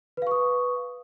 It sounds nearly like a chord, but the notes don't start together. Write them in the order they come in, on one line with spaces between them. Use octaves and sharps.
B4 F5 C#6 D#6